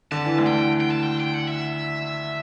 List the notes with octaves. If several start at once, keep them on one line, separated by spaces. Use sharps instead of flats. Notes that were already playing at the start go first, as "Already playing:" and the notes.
D3 A5
E3
D2 D3
G5
G5
A5
G5
G5
F#5
E5